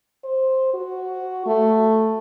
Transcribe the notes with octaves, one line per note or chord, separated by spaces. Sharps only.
C5
F#4
A3